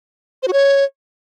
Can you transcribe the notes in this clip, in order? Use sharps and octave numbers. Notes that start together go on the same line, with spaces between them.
C5
F#4
C#5